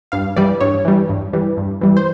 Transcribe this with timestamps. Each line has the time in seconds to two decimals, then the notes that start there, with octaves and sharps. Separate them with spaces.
0.12 G2 F5
0.36 E3 G3 D5
0.61 G2 C#5
0.85 E3 G3
1.10 G2
1.33 E3 G3
1.57 G2
1.81 E3 G3
1.97 C5